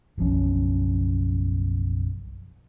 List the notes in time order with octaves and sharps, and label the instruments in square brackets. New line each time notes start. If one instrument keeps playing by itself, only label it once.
[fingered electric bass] F#1 B1 F3 C#4